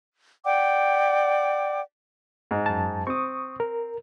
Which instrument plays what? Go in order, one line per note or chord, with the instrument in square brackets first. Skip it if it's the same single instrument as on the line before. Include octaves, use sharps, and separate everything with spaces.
[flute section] D5 F#5 G5 D6
[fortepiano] G#2 D#4
[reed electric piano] F#2 A5
[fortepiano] C4 [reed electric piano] C#6 D#6
[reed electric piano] A#4